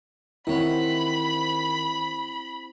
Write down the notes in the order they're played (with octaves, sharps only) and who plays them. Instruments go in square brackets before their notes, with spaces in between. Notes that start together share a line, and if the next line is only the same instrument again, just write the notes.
[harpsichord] D#3 C#5 F#5 [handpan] C4 E4 [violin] B5